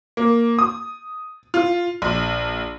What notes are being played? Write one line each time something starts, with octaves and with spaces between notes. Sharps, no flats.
A#3
D#6
F4
A#1